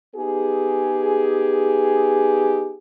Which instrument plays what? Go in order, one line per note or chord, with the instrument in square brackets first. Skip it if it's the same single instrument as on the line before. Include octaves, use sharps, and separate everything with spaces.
[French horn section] B3 D#4 G4 G#4